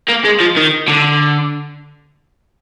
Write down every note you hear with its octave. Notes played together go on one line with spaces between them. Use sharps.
A#3
G#3
F3
D#3
D3